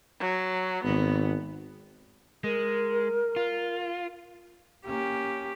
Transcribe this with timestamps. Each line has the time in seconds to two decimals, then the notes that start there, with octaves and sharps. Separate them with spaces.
0.20 F#3
0.84 G#1 B3
2.44 G#3 A#4
3.36 F4
4.85 A#3 C#4 G4